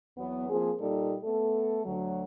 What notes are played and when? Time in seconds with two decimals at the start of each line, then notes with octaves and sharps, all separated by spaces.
0.17 E2 F#3 B3
0.49 F3 A#3 C4 G#4
0.79 A#2 G3 A#3 D#4 A4
1.23 A3 B3 A4
1.85 D2 F#3